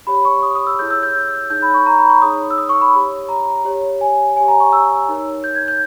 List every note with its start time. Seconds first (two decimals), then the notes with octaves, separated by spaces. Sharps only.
0.07 G4 C#5 B5
0.25 C#6
0.43 D#6
0.55 D#6
0.67 E6
0.79 E4 G#4 C#5 G6
0.90 E6
1.03 G6
1.50 D#4 G#4 C#5 G6
1.62 B5
1.74 C#6
1.86 A#5
1.98 B5
2.10 C#6
2.22 D#4 G#4 C#5 D#6
2.50 E6
2.58 D#6
2.69 C#6
2.81 B5
2.94 G4 C#5
3.29 A#5
3.65 G4 C#5
4.01 G#5
4.37 G4 C#5 G#5
4.48 A#5
4.60 C#6
4.73 E6
5.08 D#4 A#4 C#5
5.44 G6
5.55 G#6
5.68 G6